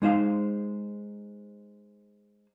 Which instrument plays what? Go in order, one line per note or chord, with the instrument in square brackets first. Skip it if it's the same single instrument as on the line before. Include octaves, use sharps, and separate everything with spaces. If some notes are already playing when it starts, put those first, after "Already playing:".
[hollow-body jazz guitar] G#3 D#4 C5 F5